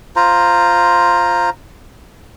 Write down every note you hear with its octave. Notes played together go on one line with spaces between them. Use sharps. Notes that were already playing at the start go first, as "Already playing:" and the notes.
F4 C5 A#5